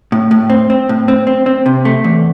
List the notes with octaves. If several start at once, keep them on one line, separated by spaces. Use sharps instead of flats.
A2
A2
C4
C4
A2
C4
C4
C4
C3
A3
E2